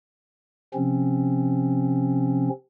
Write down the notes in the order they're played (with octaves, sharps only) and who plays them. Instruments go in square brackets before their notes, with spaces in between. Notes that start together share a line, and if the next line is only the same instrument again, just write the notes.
[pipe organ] C3 F3 C4 C#4